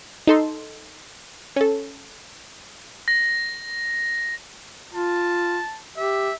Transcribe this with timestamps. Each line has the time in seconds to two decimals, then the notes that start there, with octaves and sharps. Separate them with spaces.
0.27 D#4 A4 C6
1.56 C#4 A4
3.08 A#6
4.94 F4 A5
5.97 G4 E5